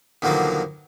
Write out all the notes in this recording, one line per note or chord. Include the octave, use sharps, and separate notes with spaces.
D#2 B2 D3 F3 F#3 A#3